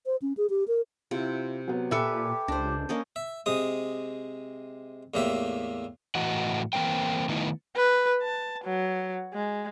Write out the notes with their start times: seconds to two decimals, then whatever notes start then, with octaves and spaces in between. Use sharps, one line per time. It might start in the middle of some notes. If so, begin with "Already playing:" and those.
0.06 C5
0.22 C#4
0.37 G#4
0.50 G4
0.68 A#4
1.11 C3 E4 F4
1.68 F#3 B3
1.91 A#2 G4 A4 B4 E5 G#5 E6 C#7
2.48 C#2 D4 C5
2.89 A#3 C#4 D#5
3.16 E5
3.46 C3 G#3 D#6
5.14 E2 A2 A#3 G4 E5
6.15 A2 E3 F#4 D#5 F#5
6.73 E3 F3 A#3 C4 G5
7.29 D#3 A3 B3 D#4 E4
7.76 B4
8.22 A5
8.64 F#3
9.34 G#3